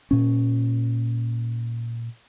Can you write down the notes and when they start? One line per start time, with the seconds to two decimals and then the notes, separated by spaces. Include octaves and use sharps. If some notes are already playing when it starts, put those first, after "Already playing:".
0.11 A#2 C#4